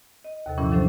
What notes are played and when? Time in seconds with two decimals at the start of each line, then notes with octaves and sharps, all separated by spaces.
0.24 D#5
0.46 D#2 C3 A4
0.58 G2 A#2 E3 F3 C#4 E4
0.71 D#3 F#3 C#4 D4 A4 C5